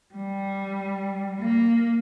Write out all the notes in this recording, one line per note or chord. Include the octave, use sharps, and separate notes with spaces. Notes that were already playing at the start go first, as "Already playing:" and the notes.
G3
A#3